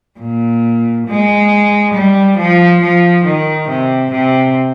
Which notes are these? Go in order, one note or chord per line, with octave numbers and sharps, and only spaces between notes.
A#2
G#3
G3
F3
F3
D#3
C3
C3